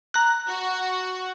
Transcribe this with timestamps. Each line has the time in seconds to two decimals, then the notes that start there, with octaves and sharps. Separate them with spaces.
0.14 A#5 F#6
0.48 F#4